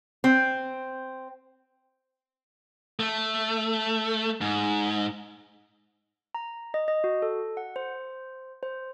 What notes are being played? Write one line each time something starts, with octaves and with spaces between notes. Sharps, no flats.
C4
A3
G#2
A#5
D#5
D#5
F#4
A4
F#5
C5
C5